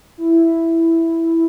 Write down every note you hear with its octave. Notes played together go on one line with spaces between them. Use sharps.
E4